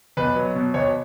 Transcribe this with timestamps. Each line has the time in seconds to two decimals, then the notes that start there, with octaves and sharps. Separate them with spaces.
0.17 B1 B4
0.36 F#3
0.55 B2
0.74 B1 C#5